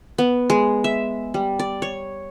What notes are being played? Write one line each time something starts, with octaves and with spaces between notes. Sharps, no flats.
B3
G#3
E5
G3
D5
C#5